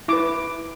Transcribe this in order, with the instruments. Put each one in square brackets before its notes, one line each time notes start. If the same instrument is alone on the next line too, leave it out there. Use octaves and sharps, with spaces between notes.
[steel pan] E4 B4 D6